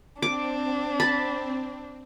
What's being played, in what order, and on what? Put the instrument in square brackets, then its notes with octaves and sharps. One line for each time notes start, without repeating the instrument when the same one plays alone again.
[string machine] C4 [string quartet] D4 [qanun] D6
[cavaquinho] A5 [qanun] B5